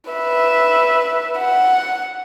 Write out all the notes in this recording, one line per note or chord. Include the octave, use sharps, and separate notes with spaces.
B4 E5
F#5